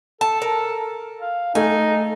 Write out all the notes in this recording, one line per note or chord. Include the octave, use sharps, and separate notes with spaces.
A4 A5
A#4
F5
A3 D#4 G#5